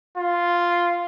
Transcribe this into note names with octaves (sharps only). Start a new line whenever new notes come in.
F4